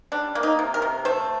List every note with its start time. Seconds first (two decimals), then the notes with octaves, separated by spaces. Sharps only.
0.12 G3 D4
0.35 A#3
0.43 D#4
0.59 C3
0.74 A#4
0.82 C3
1.05 A3 C5